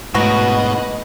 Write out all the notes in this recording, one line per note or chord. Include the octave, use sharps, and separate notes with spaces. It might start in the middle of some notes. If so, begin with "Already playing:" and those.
G#2 B2 F#3 A3 F#4 B4 D#5